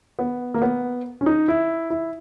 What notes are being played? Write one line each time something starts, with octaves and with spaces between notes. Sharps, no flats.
B3
A#3
B3
C#4
D#4
E4
E4